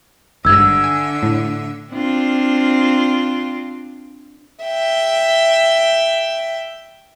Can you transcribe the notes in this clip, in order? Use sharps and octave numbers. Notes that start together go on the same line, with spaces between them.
G#1 G2 D3 E5 E6 G#6
G#5
A2
C4 D4 F4
E5 G5